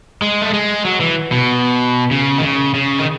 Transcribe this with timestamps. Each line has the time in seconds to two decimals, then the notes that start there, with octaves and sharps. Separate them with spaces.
0.22 G#3
0.42 A3
0.53 G#3
0.85 F#3
1.00 E3
1.32 B2
2.11 C#3
2.38 D#3
2.43 C#3
2.74 C#3
2.99 D#3